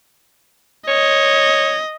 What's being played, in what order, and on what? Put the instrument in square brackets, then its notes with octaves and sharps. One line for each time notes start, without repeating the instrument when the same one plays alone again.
[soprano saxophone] C#5 [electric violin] D#5